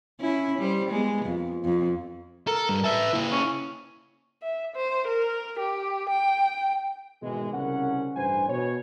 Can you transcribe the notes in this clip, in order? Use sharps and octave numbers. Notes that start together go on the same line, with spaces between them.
C#4 E4
G3 C5
G#3 B3
F2
F2
A4 A#4
G2
B4 E5 A5
A#3 E4
C#4
E5
C5
A#4
G4
G5
G#1 B2 E3 G#3
C2 C#3 C#4 A#4 F#5
A1 G2 B4 C5 G#5
B2 C#5